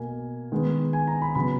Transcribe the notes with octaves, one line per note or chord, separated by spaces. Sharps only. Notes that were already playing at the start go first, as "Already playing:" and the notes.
Already playing: B2 A#3 G#5
D#3 G#3 B3
G#5
A#5
B5
C#3 F#3 B3 B5